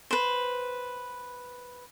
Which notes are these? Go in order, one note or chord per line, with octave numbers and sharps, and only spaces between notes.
B4 C5